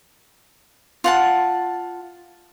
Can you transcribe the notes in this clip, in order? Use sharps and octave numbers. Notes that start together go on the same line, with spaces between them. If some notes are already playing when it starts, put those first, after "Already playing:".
F4 F#5 A5